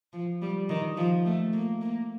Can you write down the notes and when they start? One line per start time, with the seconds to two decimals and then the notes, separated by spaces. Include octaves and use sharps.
0.13 F3
0.42 G3
0.69 D#3
0.97 F3
1.26 A3
1.53 A#3
1.82 A#3